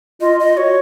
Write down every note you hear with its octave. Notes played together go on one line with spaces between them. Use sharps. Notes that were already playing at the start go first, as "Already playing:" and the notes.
F4 D#5
D#5
F#4 C#5